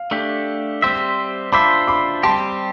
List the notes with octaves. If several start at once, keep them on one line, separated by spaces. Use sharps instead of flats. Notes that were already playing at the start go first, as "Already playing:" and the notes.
Already playing: F5
A3 D4 G4
G3 C4 G4 C5 E5
D4 F4 C5 E5 B5 D6
B5 D6
G3 C4 G4 A5 C6